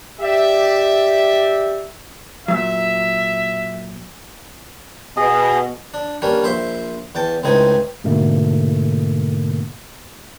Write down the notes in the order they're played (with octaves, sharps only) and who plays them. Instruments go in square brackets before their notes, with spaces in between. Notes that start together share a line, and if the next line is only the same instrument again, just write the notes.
[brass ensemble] G4 D5 E5
[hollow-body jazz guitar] A#2 F#3 [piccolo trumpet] E5
[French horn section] B2 [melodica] G#4 D#5
[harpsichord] D4
G3 A#3 C#4 D4 G4
A#1 C5 E5 C6
E2 G5 A5
C#2 A2 C#3 C4 D#4 G#5
[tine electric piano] G#2 B2 D3 A3 A#3